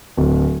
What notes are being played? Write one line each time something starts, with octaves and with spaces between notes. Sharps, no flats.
D1